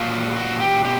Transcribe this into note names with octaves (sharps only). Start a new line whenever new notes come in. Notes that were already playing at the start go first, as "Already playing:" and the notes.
Already playing: A#2 F#3 F4
F#4
G4
B2 G4